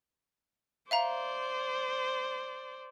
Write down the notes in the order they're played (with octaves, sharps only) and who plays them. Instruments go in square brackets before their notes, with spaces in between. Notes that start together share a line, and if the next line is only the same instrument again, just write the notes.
[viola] C5 D5 [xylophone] E5 F5 A#5